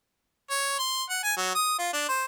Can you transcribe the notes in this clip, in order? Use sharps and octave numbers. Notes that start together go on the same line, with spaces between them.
C#5
C6
F#5
G#5
F#3
D#6
F4
D4
C5